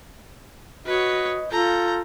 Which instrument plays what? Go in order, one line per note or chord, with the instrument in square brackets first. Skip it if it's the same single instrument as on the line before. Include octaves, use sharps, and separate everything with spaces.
[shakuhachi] F#4 [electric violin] B4 C#5 [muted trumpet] D#5
[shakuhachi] F4 [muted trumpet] A4 [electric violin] A#5 G6